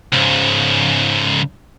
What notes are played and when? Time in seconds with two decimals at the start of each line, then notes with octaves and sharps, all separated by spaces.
0.13 C#2 G#2